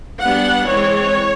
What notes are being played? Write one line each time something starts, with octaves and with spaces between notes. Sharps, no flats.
G3 B3 D4 F#5
E3 G#3 C4 C#5